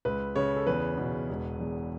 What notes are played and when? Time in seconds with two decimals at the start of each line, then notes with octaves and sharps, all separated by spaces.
0.05 C#2 B4
0.36 C#3 C#5
0.56 A4
0.67 E2 B4
0.98 B2
1.29 E1
1.60 E2